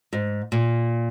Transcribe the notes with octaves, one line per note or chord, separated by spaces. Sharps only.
G#2
A#2